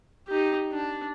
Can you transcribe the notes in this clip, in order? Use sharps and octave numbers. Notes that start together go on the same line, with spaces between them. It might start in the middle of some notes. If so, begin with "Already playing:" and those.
D#4 G4
D4